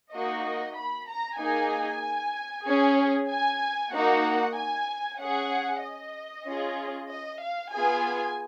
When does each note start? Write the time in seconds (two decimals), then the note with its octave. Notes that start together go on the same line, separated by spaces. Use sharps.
0.12 A#3 D#4 F#4 D#5
0.44 D#5
0.76 B5
1.08 A#5
1.39 A#3 D#4 G#4 G#5
2.66 C#4 G#4
3.30 G#5
3.93 A#3 D#4 F#4 F#5
4.56 G#5
5.20 C#4 G#4 F#5
5.83 D#5
6.47 C#4 F4 G#4
7.10 D#5
7.42 F5
7.74 B3 F4 G#4 G#5